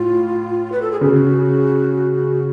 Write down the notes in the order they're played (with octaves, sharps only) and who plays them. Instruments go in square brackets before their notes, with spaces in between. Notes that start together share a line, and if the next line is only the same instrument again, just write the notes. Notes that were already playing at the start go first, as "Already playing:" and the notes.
Already playing: [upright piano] A2 [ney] F4
[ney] B4
A4
G#4
[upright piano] C#3 [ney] F#4